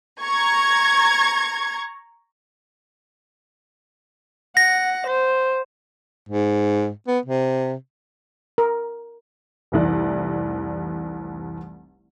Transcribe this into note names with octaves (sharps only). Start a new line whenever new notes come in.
A#5 C#6 G#6
F#5 A#6
C5
G#2
B3
C3
A#4
F1 C2 E3 D5